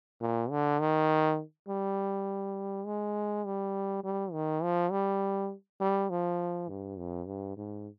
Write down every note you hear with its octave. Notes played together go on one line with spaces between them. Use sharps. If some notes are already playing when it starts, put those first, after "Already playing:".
A#2
D3
D#3
G3
G#3
G3
G3
D#3
F3
G3
G3
F3
G2
F2
G2
G#2